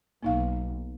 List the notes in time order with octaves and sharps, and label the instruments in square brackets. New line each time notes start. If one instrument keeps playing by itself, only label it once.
[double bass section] B1 [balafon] A#3 D#4 F5